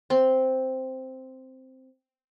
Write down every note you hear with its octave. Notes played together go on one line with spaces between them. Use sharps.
C4 C6